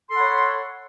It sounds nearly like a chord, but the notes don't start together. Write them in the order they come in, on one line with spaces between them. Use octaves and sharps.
C6 A4 F#5 B5 C#5